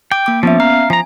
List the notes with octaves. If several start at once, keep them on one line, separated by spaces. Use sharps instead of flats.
G5 D6 D7
A#3 D6
F3 B3 C#4 E5
F5 A#5
F3 G#5 A#5